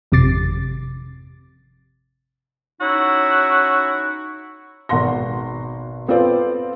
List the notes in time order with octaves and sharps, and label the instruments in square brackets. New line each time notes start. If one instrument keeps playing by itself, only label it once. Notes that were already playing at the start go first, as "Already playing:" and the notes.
[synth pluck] G#1 F2 C3 D6 A6 C7
[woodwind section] C#4 D#4 E4 F#4
[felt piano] G#1 B2 F#5 C6 A#6
B3 C4 F4 A4 C5 D5